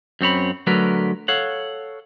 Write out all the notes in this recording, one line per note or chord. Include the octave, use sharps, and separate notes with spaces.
F#2 C4 C#5 B5
D3 F#3 A3 A#4 B4
A4 C#5 F5 F#5